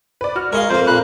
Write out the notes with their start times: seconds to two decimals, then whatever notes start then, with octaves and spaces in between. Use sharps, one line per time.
0.21 B4 D5
0.36 F#4 F6
0.53 G#3 A#4 C#5 D#5 F5
0.69 F2 A#3 C5
0.87 A#2 F5 A#5 B5 F#6